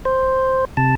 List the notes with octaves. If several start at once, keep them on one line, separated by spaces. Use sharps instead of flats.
C5
C3 A5